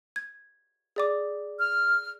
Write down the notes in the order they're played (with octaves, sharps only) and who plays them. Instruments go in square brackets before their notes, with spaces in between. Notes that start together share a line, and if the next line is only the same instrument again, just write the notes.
[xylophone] G#6
G#4 D5 D6
[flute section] F6